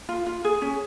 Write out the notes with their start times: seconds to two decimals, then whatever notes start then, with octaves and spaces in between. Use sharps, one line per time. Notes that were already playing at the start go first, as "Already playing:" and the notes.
0.09 F4
0.26 F4
0.45 G#4
0.62 C#4